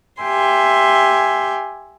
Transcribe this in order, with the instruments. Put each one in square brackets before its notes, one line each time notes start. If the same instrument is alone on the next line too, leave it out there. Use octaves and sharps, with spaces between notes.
[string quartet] G4 E5 G#5 C6